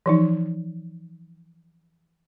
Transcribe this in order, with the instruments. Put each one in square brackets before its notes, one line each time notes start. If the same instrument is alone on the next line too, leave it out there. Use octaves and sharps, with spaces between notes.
[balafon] E3 F3 D#4